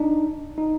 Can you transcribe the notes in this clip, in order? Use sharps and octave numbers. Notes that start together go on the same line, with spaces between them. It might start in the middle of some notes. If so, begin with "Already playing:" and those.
Already playing: D4 D#4
D#4